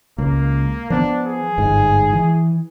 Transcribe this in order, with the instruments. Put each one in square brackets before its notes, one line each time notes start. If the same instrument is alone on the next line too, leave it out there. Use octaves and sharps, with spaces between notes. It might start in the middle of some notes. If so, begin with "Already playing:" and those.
[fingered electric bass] C#2 [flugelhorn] A#3
[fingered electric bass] F3 B3 [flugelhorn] D4
[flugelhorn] G#4
[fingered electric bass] G1 G#2
E3